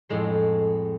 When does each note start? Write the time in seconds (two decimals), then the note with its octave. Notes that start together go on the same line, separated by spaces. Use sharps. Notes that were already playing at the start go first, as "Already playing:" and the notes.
0.09 F2 A2 G#3 C6